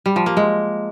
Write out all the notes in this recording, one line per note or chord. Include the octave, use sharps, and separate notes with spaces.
G3
F3
A#3
G#3